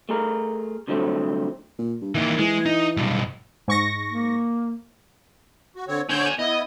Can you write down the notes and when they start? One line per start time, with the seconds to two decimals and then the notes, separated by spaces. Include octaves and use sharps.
0.09 A3 G#4 A#4
0.87 C2 D3 F3 F#3 A3 C4
1.79 A#2
2.01 G2
2.15 D#3 E3 A#3
2.39 E3 G#3
2.66 D#4
2.97 B1 G2
3.68 G#2 C#6 A#6
4.10 A#3
5.76 F#4
5.88 D3 C4 C#5
6.09 D3 C#4 C5 C#5 G6
6.22 D5 G#5
6.39 B3 E4 D#5